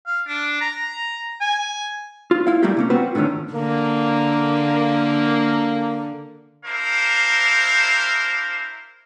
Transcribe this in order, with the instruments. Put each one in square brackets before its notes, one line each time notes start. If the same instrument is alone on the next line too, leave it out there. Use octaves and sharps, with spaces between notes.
[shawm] F5
D4
A#5
G#5
[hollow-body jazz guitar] F4
E4 F5
G3 A3 A#3 E4 F4 G4
C3 A#3 C#4
B3 C4 F4 F#4 B4 C5
A2 D3 D#3 A3 C#4
[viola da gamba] D3 [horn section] A#3
[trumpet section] D4 E4 A#4 C5 F5